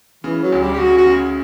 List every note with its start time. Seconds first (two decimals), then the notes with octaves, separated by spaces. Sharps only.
0.24 C#3 E3
0.43 F#3
0.52 D2
0.62 G3
0.74 G4
0.79 C#3 F#4
0.98 F#4
1.06 C#3